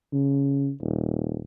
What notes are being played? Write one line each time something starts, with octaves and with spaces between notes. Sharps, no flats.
C#3
D#1